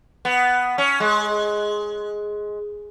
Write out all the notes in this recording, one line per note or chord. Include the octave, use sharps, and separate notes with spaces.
B3
C#4
G#3